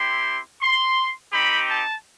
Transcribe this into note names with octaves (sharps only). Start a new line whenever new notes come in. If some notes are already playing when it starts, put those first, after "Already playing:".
Already playing: C4 E4 G4 C6
C6
C4 D#4 G4 B5
A5